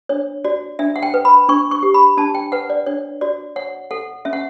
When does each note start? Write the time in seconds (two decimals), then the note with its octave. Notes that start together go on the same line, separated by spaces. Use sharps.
0.09 D4 C#5
0.44 F#4 D5
0.79 D4 E5
0.96 F#5
1.03 G5
1.14 B4
1.25 B5
1.49 D4 C#6
1.71 C#6
1.83 G4
1.94 B5
2.17 D4 A5
2.35 G5
2.52 B4 F#5
2.70 D5
2.86 D4 C#5
3.21 F#4 D5
3.56 C#5 F#5
3.91 A4 F#5
4.25 C#4 E5
4.33 F#5